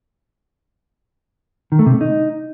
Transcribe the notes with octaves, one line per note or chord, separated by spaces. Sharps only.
D#3
A3
C3
A3
D#4